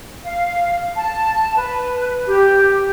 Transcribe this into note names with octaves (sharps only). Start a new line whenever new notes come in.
F5
A5
B4
G4